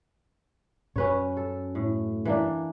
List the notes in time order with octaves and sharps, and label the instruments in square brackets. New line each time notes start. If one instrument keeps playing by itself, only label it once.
[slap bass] F#2 [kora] C#4 B4 C#5
[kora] A4
A2
E3 A#3 D4